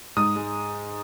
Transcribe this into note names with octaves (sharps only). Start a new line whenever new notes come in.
G#2 D#6
G#3